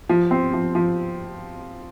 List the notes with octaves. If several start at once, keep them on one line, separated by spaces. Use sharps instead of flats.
F3
C4
F3
F3